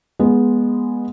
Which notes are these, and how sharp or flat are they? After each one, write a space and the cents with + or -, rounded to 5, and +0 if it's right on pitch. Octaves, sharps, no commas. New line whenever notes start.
G#3 -5 B3 -20 G#4 +0